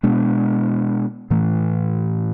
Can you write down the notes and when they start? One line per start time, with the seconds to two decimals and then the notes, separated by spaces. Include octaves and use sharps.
0.03 B2 G#3 B3 D4
1.30 A2 E3 A3